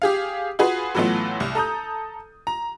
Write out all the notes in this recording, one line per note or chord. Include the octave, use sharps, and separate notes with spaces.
G4 G#4 F5
F4 F#4 G#4 B4
A2 E3 F#3 A3 B3 F4
C2
A4 A#5 D#6 G6
A#5